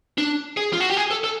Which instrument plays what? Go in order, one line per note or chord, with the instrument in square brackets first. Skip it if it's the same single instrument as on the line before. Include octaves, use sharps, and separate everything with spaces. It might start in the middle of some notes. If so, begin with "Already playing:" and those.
[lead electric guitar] D4
G#4
F4
F#4
G4
G#4
A4
A4